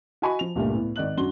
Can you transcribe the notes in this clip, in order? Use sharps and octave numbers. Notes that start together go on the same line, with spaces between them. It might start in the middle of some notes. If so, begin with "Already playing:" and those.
F#4 D#5 G#5 B5 C#6
F3 F7
C#2 G2 A#2 G3 A3 A#3
A2 B3
G#1 D5 D#5 F#6 F#7
F#2 D4 F#4 C6 G7